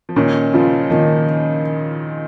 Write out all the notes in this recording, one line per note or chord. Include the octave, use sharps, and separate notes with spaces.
F3
A#2 D#3 C#4
C#3 F3 F4
D#3 F3 A#3